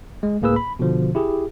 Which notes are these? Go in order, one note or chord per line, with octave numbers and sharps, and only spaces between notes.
G#3
C#2 A2 A#3 G#4 B4 E6
B5
B2 D3 F3
E4 G4 G#4